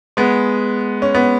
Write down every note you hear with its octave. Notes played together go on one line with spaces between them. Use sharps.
G#3 B3
C#4
B3